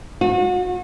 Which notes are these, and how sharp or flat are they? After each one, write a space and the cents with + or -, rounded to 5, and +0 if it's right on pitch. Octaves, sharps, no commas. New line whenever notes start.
F#4 -35